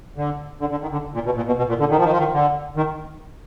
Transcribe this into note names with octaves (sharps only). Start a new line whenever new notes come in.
D3
D3
D3
D#3
D3
A#2
B2
A#2
B2
B2
A#2
D3
D#3
F3
D#3
F3
D#3
D3
D#3